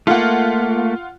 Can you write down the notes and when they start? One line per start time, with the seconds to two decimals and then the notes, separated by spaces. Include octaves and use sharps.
0.07 A3 A#3 F4 F#5